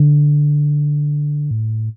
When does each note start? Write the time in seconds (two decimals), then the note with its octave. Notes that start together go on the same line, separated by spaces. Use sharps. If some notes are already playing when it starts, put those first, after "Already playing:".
Already playing: D3
1.51 A2